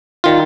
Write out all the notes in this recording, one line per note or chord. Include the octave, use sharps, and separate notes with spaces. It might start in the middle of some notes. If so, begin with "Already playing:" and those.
D#3 G3 F4